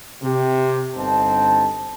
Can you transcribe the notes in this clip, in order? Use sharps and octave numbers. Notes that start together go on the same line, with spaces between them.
C3 G4
G1 G2 C4 D#4 A5